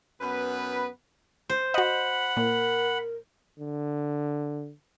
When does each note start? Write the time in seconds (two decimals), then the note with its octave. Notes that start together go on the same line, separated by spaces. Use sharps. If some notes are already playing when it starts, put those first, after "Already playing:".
0.21 F#2 B3 B4
1.50 C5
1.74 F#4 D#5 F#5 B5
2.37 A#2 A#4
3.59 D3